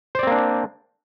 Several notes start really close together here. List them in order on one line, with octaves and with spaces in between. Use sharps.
C5 D5 C4 A#3 D4